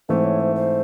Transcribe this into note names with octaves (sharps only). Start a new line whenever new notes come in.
G#2 E3 A3 C4 E4 C5
C#5
C5
C5